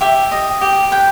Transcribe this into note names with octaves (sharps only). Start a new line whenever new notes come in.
G4 E5
D#5
G4
B4 G5